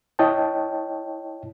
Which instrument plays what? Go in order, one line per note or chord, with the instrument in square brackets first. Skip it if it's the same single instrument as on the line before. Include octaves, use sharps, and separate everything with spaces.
[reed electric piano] E4 C#5 D#5 G5 A5